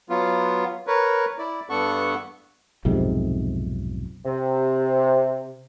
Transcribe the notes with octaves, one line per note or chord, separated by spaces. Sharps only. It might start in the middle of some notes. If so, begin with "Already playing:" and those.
F#3 B3 F4
A#4 B4 C#5
E4 D5
G2 B3 D4 A4 F#5 C#6
B1 F2 G#2 C3
C3